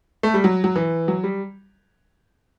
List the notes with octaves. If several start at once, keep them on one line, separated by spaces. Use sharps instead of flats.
A3
G3
F#3
F#3
E3
F#3
G3